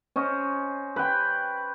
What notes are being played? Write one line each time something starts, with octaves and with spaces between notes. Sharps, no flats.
C#4 C5 D#5
B4 G5